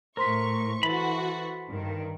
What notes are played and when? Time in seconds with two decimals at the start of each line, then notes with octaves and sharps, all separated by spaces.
0.17 A2 A#4 C5 C6 C#6 B6
0.83 E3 F#4 A4 B5
1.71 G2 D#3